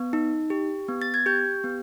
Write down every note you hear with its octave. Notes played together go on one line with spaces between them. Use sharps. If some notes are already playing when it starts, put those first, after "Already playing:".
Already playing: B3
D#4
G4
B3
A6
G#6
G4 G6
B3